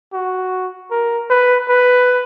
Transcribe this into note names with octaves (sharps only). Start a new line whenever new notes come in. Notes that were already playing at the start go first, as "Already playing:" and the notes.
F#4
A#4
B4
B4